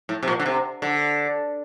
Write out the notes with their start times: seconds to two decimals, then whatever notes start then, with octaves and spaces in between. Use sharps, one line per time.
0.09 A2
0.23 C3
0.28 A#2
0.39 D3
0.46 C3
0.82 D3